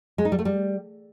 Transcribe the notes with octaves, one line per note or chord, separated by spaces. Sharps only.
G#3
D#4
G3
A3
G3